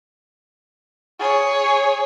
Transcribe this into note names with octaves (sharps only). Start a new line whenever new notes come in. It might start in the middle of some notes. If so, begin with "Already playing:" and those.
G#4 C#5